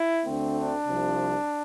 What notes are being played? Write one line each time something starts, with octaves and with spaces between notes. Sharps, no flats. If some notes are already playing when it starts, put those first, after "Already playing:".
Already playing: E4
D2 D3 A3 C4
D4
C2 C3 F3